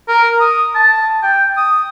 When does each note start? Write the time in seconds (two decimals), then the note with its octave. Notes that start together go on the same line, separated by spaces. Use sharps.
0.08 A#4
0.40 D#6
0.75 A5
1.23 G5
1.57 D#6